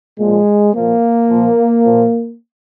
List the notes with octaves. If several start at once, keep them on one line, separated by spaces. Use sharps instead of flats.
A#2 F3 G#3
A#2 F3 A#3
A#2 F3
A#2 F3